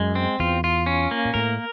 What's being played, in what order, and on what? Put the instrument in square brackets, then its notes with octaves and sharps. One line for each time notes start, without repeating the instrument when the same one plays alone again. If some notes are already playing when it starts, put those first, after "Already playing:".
Already playing: [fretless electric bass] F#2 [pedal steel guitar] G#3
[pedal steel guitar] C4
[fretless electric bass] E2 [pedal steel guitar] F4
[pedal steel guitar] F4
C#4
A#3
[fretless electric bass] A#2
[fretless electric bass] A2 [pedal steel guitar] A#4